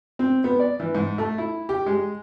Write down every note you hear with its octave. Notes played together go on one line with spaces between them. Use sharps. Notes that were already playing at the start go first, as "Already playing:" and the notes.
C4
B3
D5
E3
G#2
A3
E4
G4
G#3